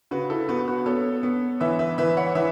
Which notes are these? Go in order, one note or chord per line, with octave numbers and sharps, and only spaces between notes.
C#3 F#4 B4
E4 A4
B3 F#4 B4
F#4 B4
B3 A4 C#5
B3
E3 B4 E5
B4 E5
E3 B4 E5
C#5 F#5
E3 B4 E5